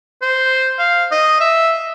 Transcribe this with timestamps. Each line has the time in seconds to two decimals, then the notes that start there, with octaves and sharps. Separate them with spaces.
0.22 C5
0.79 F5
1.11 D#5
1.40 E5